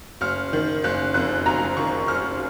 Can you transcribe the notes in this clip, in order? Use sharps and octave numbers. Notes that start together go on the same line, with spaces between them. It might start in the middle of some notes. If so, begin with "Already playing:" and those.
F#1 F6
D#3
F#1 F#6
F2 F#6
F#1 A#5
D#3 C#6
F#1 F6